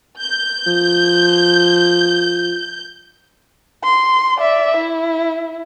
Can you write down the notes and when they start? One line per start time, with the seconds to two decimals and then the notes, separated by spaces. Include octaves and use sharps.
0.19 G6
0.67 F3
3.84 C6
4.39 D5 E5
4.77 E4